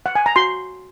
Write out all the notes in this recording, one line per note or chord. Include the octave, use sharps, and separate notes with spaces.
F#5
G#5
A#5
F#4 C6